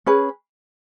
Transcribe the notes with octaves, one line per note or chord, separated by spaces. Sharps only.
C#4 G#4 B4